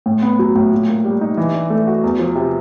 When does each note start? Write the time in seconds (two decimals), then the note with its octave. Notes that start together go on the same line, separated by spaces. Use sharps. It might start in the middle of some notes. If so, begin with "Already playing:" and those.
0.06 A2
0.22 B3
0.39 F#3
0.55 A2
0.72 A#2
0.88 A#3
1.05 G3
1.21 D#4
1.37 E3
1.54 D4
1.70 A3
1.87 F#4
2.04 E2
2.19 F3
2.35 C3